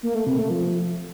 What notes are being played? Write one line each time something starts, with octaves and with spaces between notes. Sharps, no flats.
A#3
A3
C3
A3
F3